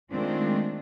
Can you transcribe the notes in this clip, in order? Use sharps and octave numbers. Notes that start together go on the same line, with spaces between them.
D#3 G#3 A3 C4 D4 F4